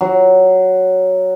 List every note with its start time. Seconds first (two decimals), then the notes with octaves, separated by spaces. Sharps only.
0.01 F#3